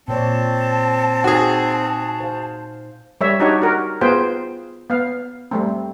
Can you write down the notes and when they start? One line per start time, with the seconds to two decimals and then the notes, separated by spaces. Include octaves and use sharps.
0.08 A#2 C4 C#5 D5 A5
1.24 D#4 F#4 G#4
2.20 C5 F5
3.21 G3 C#5 E5
3.40 D4 D#4 F#4 G4 C#5
3.62 F#4 A#4
4.01 B3 F4 G#4 C5 G5
4.90 B3 F5
5.51 G3 A3 C4